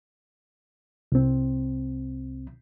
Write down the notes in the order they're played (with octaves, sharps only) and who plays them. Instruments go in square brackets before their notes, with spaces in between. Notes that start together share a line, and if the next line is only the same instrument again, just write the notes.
[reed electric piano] C2 C4